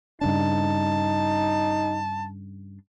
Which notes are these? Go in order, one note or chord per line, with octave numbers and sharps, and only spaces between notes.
G2 C#3 D4 D#4 A5